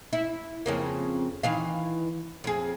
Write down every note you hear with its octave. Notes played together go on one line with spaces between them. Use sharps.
E4
F2 C#3 A#3
D#3 E3 F5
F2 G#4